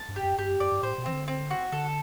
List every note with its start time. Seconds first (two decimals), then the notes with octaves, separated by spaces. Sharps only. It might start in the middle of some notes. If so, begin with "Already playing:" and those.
Already playing: A5
0.08 G2
0.16 G4
0.23 F#2
0.38 G2 G4
0.49 F#2
0.60 F#2 D5
0.72 G2
0.83 A2 C5
0.98 B2
1.06 E3 C4
1.13 D3
1.28 C4
1.51 F#4
1.72 D3 A4